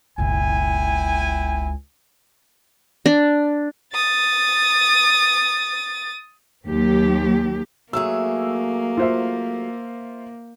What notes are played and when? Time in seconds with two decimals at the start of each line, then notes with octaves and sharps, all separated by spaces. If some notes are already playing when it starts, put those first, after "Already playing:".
0.18 F#1 C#2 B2 E4 G5 G#5
3.06 D4
3.94 D#6 A6
6.67 D#2 F#3 G4
7.93 F#3 A3 A#3 G#4 E6
8.97 F4 C5 E5